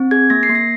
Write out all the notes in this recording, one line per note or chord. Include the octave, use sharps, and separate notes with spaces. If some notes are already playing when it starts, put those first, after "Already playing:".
Already playing: C4
G#4 G#6
A#3 A#6
C7
A#3
A#6